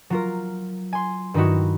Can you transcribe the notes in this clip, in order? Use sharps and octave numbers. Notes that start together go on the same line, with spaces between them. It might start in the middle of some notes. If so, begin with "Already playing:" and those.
F#3 F4 A#4
G#5 C6
G2 D#3 G3 D#4 E4 F#4